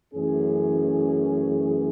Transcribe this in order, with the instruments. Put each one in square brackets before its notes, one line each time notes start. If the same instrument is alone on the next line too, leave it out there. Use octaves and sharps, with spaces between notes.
[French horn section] F#2 E3 A3 C#4 G#4